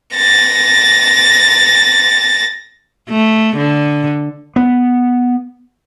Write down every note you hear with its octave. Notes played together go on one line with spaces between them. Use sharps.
A6 A#6
A3
D3
B3